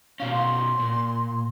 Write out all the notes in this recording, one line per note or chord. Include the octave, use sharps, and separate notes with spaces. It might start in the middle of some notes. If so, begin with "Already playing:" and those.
B2 C#4 F5
C6
A#2